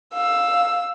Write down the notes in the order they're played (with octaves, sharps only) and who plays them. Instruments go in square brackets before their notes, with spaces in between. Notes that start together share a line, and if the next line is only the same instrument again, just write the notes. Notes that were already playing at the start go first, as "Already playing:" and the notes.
[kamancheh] F5 E6